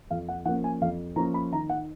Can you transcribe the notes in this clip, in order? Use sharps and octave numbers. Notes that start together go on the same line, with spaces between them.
F2 F5
F#5
F3 A#3 C#4 F#5
G#5
F2 F5
F3 A#3 C#4 A#5
B5
D#3 A#5
F#5